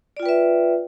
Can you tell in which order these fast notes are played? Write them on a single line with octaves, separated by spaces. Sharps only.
D5 F4 G5 B4 E5